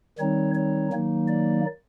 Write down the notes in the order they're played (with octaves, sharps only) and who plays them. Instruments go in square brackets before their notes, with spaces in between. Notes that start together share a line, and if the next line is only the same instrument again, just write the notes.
[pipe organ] D#3 G3 C4 D#4 C#5
C#5
D#3 F#3 A#3 D#4
D5